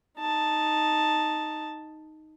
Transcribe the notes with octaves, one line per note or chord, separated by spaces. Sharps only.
D#4 A5